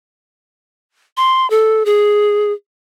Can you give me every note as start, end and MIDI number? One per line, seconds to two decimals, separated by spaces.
1.17 1.49 84
1.50 1.83 69
1.86 2.53 68